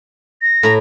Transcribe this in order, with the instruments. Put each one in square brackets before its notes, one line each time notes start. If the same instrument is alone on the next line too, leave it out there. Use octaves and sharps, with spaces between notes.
[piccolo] A#6
[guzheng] A2 A#5